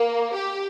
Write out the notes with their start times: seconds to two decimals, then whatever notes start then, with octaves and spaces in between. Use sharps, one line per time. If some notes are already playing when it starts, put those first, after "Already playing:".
Already playing: A#3
0.33 G4